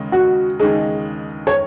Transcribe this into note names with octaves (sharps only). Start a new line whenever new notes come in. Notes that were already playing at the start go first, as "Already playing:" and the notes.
Already playing: D#2 C#3 G#3 D#4
F#4
D#2 C#3 G#3 D#4 G#4
C#5